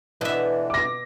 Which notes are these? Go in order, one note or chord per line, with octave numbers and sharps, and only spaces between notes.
B2 D3 E3 E5
D6 A#6